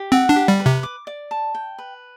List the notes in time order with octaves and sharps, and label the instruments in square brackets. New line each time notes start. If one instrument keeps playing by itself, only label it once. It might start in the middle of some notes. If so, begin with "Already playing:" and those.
Already playing: [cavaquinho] G4
[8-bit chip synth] C4 [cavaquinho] F#5
[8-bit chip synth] D4
[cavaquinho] G4
[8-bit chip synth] G3
[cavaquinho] B4
[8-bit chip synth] C3
[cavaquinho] D6
D5
A5
G5
B4